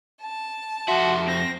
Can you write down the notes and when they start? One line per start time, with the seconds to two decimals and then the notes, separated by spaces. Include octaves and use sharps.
0.23 A5
0.88 F2 F#4 E5 C6
1.27 C4 A#6